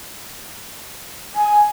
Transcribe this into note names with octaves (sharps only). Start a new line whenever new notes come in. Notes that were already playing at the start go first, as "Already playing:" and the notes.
G#5